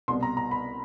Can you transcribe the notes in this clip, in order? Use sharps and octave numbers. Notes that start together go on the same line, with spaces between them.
C2 B2 G3 B3 C6
A#5
A#5
B5